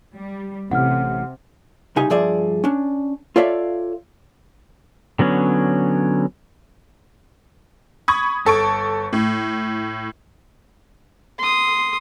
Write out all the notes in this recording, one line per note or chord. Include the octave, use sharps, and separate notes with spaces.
G3
A1 A2 C3 F#5 F6
C2 C#3 D#4 G4 G#5
G2 F3 G#4 D5 E5
C#4 D4
F4 A4 C#5 D5 E5 F5
D3 F#3 B3 C#4
B5 C#6 D#6 G#6
G1 A4 C#6 D7
A2
C6 D#6